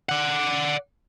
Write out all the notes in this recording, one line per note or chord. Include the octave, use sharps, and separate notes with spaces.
D5 F#5